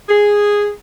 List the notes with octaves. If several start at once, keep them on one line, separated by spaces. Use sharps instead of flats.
G#4